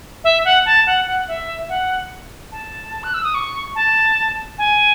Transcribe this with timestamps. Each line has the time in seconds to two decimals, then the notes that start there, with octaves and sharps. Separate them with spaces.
0.24 E5
0.45 F#5
0.66 A5
0.86 F#5
1.07 F#5
1.28 E5
1.69 F#5
2.52 A5
3.03 F#6
3.14 E6
3.24 D#6
3.34 C#6
3.75 A5
4.58 G#5